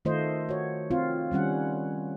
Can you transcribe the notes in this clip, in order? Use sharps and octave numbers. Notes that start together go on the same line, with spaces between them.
D#3 A3 F4 C5 D#5
F#4 C#5
C4 F4
D#3 G3 C#4 F#5